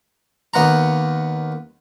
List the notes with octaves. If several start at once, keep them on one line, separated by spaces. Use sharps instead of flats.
D#2 B3 F#5 A#5